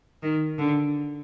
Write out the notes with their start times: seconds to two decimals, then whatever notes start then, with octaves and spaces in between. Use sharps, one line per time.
0.23 D#3
0.59 D3